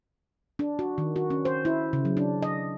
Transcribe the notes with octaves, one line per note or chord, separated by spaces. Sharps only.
D4
F#4
D#3
F#4
C#4
C5
E4
C#3
F#3
D4
D#5